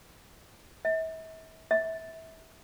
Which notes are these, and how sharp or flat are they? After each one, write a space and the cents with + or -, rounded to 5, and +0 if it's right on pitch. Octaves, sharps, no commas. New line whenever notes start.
E5 -40
E5 -25